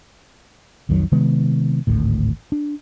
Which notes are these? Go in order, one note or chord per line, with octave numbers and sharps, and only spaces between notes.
B1 F2 D#3 F#3
C3 D#3 G#3 B3
G#1 D2 A2
D4